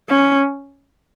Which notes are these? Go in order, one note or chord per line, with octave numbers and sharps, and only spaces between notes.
C#4